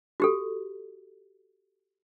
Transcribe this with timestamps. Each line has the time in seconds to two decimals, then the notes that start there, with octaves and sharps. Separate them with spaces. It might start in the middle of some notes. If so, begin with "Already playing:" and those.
0.20 F#4 G4 A4